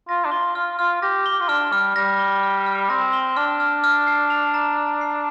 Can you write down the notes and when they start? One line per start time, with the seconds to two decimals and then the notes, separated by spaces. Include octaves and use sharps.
0.09 F4 A#6
0.25 D4
0.32 F4 G7
0.55 F4 F6
0.79 F4 F6
1.02 G4 A#6
1.26 G7
1.32 G4
1.41 F4
1.49 D4 F6
1.72 G3 F6
1.96 G3 A#6
2.19 G7
2.43 F6
2.66 F6
2.90 C4 A#6
3.13 G7
3.36 D4 F6
3.60 F6
3.84 F6
4.07 C7
4.30 F7
4.54 A#5
4.77 F6
5.01 C7